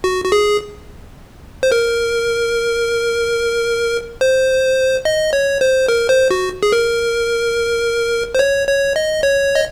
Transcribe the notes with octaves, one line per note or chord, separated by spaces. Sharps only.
F#4
F#4
G#4
C5
A#4
C5
D#5
C#5
C5
A#4
C5
F#4
G#4
A#4
C5
C#5
C#5
D#5
C#5
D#5